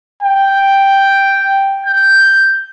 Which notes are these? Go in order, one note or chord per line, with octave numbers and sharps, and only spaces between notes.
G5
G6